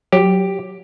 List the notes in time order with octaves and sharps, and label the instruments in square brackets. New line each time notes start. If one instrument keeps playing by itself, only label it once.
[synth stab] F#3 [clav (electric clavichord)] G4